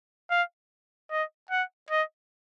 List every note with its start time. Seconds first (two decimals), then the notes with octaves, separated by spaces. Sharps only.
0.30 F5
1.11 D#5
1.51 F#5
1.91 D#5